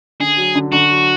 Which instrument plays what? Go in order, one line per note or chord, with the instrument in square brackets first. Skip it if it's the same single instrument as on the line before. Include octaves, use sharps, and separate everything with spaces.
[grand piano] D3 [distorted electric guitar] G#4
[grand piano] F#3
D3
[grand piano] D3 [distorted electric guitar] F#4
[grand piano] F#3